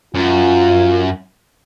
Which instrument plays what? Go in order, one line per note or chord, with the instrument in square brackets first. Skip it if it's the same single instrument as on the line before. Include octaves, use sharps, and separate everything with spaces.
[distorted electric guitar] F#2 [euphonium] F4